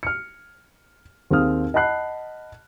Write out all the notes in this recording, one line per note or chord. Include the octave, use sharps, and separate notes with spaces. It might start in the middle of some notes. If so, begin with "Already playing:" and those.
F6 C#7
D#2 C4 G#4 F5 D#6 F6
D#5 F#5 A5 B5 F#6 C7